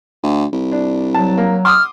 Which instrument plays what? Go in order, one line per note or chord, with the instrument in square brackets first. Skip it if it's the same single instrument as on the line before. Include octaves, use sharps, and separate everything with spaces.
[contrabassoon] D2
C2
[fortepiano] D4
[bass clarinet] F#3 [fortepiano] A5
[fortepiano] A#3
[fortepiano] C6 D6 D#6 [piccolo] F6